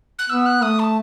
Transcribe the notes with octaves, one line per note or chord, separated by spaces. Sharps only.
F#6
B3 E6
F#6
A3 D#6
A5